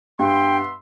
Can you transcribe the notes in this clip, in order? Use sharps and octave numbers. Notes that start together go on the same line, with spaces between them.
G2 B3 E5 G5 C6